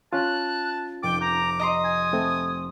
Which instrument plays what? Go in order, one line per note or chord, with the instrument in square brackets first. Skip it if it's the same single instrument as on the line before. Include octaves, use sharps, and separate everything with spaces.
[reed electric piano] C#4 F4 [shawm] A5 [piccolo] F#6
[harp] F1 [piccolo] G5 [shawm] D6
[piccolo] A#5 [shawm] D6 [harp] G6
[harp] D#5 A#5 C6 [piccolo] D#6
[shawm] G#5
[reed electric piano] A3 C4